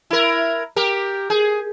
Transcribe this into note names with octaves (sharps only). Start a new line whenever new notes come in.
E4 A#4
G4 A#4
G#4